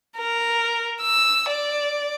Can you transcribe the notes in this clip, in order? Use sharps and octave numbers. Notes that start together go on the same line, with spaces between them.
A#4
E6
D5